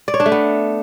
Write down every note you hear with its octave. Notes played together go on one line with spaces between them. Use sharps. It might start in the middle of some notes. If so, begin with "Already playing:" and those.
D5
C#5
D4
A3
B3